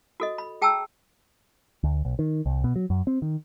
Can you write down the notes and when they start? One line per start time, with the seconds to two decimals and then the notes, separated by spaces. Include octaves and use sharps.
0.20 F#4 A4 D#5
0.38 B5
0.62 G#4 G5 A5 A#5 E6
1.83 D2
2.05 B1
2.19 D#3
2.46 C2
2.64 B2
2.76 F#3
2.90 F#2
3.07 C4
3.22 D#3